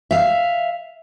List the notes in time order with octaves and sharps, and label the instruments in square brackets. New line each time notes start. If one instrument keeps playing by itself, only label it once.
[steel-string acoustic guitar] E5 F5